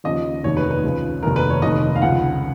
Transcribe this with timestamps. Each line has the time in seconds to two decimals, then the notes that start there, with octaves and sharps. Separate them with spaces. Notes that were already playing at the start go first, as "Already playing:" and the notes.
0.04 D#2 C#3 F3 D#5
0.44 F1 D#2 D#3 C#5
0.57 B4
0.71 B4
0.84 C#2 C#3 F3
1.23 F1 D#2 D#3 A#4
1.36 B4
1.50 C#5
1.62 F1 D#2 D#3 D#5
1.95 F5
2.02 C#2 C#3 F3 F#5